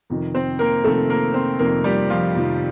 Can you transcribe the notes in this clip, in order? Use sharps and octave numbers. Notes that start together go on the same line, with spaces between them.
F2 C3 D#3
C4 C5
A#3 A#4
F2 C3 D#3 A3 A4
A#3 A#4
C4 C5
F2 C3 D#3 A#3 A#4
G3 G4
F3 F4
F2 C3 D#3